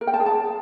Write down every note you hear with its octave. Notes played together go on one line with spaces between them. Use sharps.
A#4
G5
A5
G#4
A5